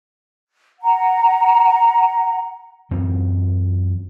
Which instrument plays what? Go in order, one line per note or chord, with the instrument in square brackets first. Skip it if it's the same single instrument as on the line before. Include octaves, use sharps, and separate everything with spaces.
[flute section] F#5 A#5
[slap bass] F#2 E3 C4